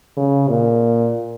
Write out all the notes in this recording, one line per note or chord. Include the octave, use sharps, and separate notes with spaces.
C#3
A#2